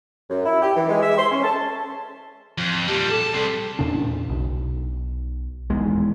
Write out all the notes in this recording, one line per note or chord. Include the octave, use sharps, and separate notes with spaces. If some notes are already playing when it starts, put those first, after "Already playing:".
F#2
E4
G4
E3
G#3
E5
C6
C#4
A5
F2
A#2 G3 G4 A5
G#4 A4 A5 D6
G3 C4
E2 A#2 C#3 D4
B1
D#1 E2 G#2 G#3